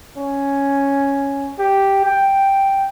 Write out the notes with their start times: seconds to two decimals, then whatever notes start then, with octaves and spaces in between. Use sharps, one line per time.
0.18 C#4
1.59 G4
2.06 G5